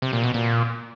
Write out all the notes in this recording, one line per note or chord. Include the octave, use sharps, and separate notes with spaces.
C3
A#2
B2
A#2